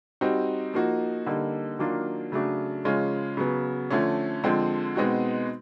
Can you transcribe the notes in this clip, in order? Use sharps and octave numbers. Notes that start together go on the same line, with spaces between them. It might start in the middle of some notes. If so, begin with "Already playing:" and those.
G3 C4 D#4 F#4
F3 A#3 D#4 F#4
D3 G3 A#3 D#4
D#3 F#3 A#3 D4 F4
C#3 F#3 A3 D4 F#4
C#3 F3 G#3 C#4 F4
C#3 F#3 B3
D3 F3 A3 C#4
D3 F3 G#3 C4
B2 G#3 C4 D#4 F#4